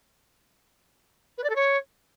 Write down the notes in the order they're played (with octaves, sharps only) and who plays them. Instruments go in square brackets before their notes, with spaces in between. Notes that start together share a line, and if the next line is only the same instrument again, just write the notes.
[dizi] B4
D5
A4
C#5